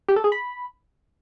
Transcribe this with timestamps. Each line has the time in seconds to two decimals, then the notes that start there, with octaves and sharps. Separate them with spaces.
0.09 G4
0.16 A4
0.24 G#4
0.32 B5